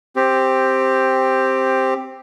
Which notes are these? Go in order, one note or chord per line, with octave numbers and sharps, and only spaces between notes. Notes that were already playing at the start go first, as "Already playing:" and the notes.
C4 G4